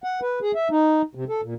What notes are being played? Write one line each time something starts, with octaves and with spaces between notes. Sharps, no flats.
F#5
B4
G#4
E5
D#4
C3
A4
A#2